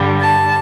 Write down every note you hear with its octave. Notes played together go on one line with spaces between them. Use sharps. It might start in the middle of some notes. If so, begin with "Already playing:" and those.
Already playing: G2 D3 G3
A5